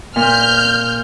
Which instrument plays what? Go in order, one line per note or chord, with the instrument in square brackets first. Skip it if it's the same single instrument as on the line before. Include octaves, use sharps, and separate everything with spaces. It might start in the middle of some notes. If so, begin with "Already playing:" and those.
[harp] A#2 [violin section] F6 G6